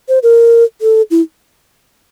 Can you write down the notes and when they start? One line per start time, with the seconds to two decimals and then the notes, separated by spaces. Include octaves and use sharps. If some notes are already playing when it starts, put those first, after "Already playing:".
0.09 C5
0.23 A#4
0.81 A4
1.11 E4